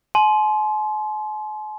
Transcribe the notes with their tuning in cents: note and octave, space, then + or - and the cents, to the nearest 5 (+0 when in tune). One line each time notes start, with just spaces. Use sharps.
G#5 +45 C6 +0